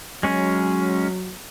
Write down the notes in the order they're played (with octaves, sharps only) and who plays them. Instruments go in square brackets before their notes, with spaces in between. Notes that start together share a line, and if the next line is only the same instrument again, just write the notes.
[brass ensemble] F#3 [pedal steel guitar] G#3 C#4